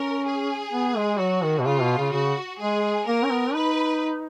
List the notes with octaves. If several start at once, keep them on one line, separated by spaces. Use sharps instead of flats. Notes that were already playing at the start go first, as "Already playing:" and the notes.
Already playing: C#4 A#4
G#4
B3
G#3
F#3 F#4
D#3
B2
C#3 F4
B2
C#3
C#3 F#4
G#3 G#4
A#3 A#4
C#4
B3
D#4 B4